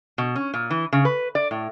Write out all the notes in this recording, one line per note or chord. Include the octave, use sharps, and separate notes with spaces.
B2
C#4
A#2
E3
C#3
B4
D5
A2